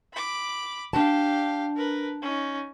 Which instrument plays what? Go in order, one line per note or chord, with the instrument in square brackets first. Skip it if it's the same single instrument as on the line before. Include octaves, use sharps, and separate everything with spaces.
[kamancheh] B5 D6
[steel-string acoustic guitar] D4 A5 [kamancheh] G4 F5
[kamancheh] A#4 B4
C#4 D#4